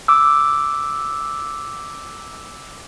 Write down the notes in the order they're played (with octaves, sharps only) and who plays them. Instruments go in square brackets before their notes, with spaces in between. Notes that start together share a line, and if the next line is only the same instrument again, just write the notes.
[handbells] D6 E6